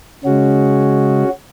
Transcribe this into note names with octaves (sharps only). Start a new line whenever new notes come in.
C#3 G#3 C#4 F#4